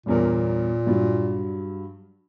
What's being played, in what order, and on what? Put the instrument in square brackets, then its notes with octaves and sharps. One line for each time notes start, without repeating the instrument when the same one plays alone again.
[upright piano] G1 E2 A#4 [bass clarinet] A#2
[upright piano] G2 F#3